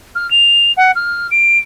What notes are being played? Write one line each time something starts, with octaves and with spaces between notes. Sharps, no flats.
F6
F7
F#5
F6
D7